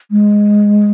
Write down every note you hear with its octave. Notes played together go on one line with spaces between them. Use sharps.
G#3